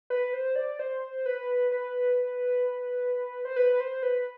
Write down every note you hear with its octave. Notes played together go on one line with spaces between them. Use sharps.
B4
C5
D5
C5
B4
B4
C5
B4
C5
B4